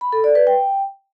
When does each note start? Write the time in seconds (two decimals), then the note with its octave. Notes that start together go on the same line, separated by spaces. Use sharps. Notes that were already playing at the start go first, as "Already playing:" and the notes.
0.01 B5
0.13 A4
0.24 D5
0.35 B4
0.47 G5